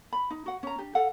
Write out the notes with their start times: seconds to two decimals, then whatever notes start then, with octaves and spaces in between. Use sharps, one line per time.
0.13 B5
0.30 D#4
0.46 F#4 F#5
0.63 C#4 A#5
0.78 D4 G4
0.95 A4 F5 F#5